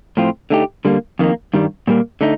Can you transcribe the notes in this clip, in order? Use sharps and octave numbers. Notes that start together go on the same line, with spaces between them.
A2 F3 C4 F4
D3 A3 D#4 G4
D3 G3 A#3
F2 D#3 A#3
G2 D#3 G3
A#2 G3 A#3
D3 A3 D#4